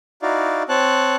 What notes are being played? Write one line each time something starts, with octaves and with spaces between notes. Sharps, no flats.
D#4 E4 F#4 D5 F5
C4 C#5 A5 F#6